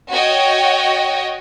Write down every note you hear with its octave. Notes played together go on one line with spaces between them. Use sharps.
F#4 C#5 D#5 G5